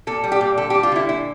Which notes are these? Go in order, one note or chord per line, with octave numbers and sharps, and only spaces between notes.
A#2 A4
G3
G4
A#2
D3 A4
G3 G4
F4
D3 E4
A#2 E4